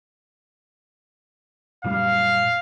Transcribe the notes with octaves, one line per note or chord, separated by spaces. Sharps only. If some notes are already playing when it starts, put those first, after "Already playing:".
F#2 A#2 G3 F5